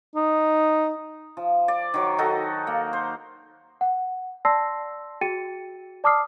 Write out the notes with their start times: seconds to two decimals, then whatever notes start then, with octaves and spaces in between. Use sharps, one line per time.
0.16 D#4
1.37 F3
1.68 D5
1.94 D#3 F#3
2.18 D#3 D#4 F#4 A4
2.67 A#3
2.93 C5
3.81 F#5
4.45 D5 A5 C6 E6 A#6 C7
5.21 F#4 G#4 G5 A6 C#7 D#7
6.04 D5 A5 D6 D#6 F6 C7